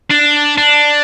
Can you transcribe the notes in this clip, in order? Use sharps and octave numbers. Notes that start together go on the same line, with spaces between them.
D4
D4